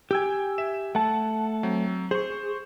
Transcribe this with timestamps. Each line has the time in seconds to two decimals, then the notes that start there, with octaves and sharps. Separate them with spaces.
0.11 G4 G5 G#5 E6 G#6
0.58 E5 E7
0.95 A3 F#5 A5
1.63 F#3 C4
2.11 G#4 C5 C#6